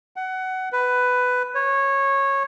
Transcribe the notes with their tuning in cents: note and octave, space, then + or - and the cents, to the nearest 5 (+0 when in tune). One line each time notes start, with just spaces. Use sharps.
F#5 +20
B4 +10
C#5 -15